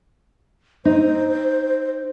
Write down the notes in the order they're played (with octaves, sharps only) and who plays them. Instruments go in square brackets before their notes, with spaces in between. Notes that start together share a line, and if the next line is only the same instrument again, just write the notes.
[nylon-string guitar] D#4 [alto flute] C5